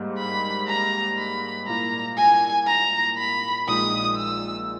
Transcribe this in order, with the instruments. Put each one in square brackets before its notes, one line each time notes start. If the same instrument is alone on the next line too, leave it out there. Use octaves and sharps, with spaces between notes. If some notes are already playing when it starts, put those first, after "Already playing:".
Already playing: [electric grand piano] G#2 G3 A#3
[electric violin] B5
A#5
B5
[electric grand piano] A#2 A#3 E4 [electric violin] A#5
[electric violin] G#5
A#5
B5
[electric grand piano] A#1 A#2 G#3 D#4 [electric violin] D#6
[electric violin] E6